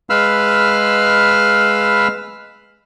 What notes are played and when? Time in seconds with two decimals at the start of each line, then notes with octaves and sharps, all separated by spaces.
0.10 G#3 B4 F5 B5 E6 F6